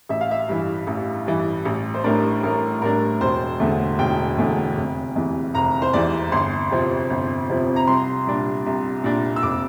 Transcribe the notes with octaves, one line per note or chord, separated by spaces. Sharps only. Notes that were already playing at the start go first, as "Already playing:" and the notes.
A1 E5
F5
E5
G2 E3
A1
G2 E3
A1
C5
A2 G3 D4 A#4
A1 A#4
A2 G3 D4 A#4
E1 C5
E2 D3 A3
E1 G5
E2 D3 A3
F1
E2 C3 E3
F1 A#5
C5
E2 C3 E3 D5
G1 C6
F2 C3 F3 C4
G1
F2 C3 F3 C4
A#5
C2 C6
A#2 G3 D4
C2
A#2 G3 D4
E6
F1 D6